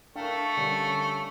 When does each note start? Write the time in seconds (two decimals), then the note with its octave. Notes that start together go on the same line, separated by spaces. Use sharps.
0.16 A3 D4 A#4 F5 G5 C#6
0.57 D3 G3 C#4